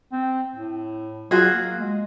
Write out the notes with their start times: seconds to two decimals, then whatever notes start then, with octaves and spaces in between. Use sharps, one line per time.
0.12 C4
0.56 A2
1.31 F#3 F4 F#4 G#4
1.54 A#3
1.80 G#3